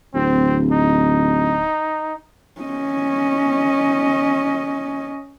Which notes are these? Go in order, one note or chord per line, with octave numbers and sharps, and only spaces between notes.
D1 C4
D#4
C#4 D#5